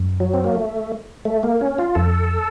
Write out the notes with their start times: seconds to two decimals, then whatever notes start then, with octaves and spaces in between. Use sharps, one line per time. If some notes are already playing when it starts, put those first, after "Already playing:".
Already playing: F#2
0.20 F#3
0.34 C4
0.44 A#3
0.55 A3
1.25 A3
1.43 A#3
1.61 C#4
1.78 F4
1.95 F2 A4